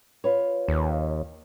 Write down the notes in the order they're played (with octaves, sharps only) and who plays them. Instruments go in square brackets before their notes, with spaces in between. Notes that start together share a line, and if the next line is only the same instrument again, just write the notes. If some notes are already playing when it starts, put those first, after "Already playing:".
[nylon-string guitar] F4 B4 C#5
[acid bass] D#2